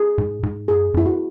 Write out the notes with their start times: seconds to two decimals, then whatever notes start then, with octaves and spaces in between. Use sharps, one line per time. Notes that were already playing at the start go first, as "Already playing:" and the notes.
Already playing: G#4
0.18 G#2
0.43 G#2
0.68 F#2 G#4
0.94 F#2 E4
1.06 F#4